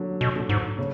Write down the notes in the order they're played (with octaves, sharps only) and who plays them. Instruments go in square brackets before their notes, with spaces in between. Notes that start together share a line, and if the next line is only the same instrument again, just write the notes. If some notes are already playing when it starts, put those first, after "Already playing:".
Already playing: [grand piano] D3 F#3
[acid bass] B2
[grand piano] D3
[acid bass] G#2
[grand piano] C#3